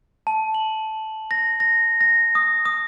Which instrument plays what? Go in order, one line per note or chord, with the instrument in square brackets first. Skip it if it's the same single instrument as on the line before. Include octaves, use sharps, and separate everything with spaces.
[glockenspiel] A5
F#7
A#6
A#6
A#6
D#6
D#6